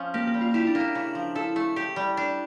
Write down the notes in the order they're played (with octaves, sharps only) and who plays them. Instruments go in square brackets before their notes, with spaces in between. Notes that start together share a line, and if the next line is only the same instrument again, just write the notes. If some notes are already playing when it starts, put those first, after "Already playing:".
Already playing: [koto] F3 C#4
[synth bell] A#3 [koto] G4
[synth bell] A#3
[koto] G3
[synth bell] F4
[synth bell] E4 [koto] G4
[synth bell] D4
[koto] A#3
[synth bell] E4
[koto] C#3
F3
[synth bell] E4 [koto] A4
[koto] A3
G4
G3
D4